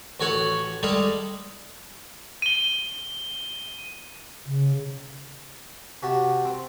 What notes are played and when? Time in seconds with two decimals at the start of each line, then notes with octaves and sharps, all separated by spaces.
0.20 A1 F#4 A4 C#5 F#5
0.83 G3 G#3 G4 A4 D#5 F5
2.42 D#7 G7
4.46 C#3
6.02 C3 F#4 G4 F#5 A5
6.45 C4